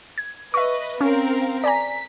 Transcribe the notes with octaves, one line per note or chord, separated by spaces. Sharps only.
G#6
B4 D#5 E5 C#6
C4 C#4 A#4 F5
D5 G#5 A#5 B6